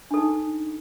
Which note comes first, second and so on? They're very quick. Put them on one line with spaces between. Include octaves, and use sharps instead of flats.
D4 A4 D#4